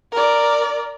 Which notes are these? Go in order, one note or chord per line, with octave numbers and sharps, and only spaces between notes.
A#4 D5